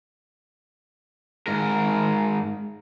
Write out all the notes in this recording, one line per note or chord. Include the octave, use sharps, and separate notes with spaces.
G#2 A#4